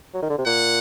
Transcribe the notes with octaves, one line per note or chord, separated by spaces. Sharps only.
F#3
D#3
D3
C3
A#2 F#5